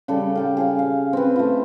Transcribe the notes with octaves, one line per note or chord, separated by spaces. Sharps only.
C#3 G3 A4
F5 G5 A5
G#4 C#5 F5
F5
C4 B4
A3 F4